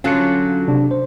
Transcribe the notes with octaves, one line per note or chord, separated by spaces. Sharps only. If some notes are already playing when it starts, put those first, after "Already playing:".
D3 F#3 C#4 F4 F#6 C#7
C3 D4
C5